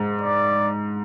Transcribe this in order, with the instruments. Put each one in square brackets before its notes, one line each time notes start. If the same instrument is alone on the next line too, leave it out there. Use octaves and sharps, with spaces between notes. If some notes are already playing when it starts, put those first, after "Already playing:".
Already playing: [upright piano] G#2
[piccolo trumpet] D5